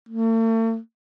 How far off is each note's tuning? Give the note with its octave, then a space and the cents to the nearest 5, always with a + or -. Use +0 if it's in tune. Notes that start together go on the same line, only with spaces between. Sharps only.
A3 +45